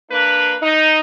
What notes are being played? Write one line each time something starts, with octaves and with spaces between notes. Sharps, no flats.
A#3 D4 B4
D#4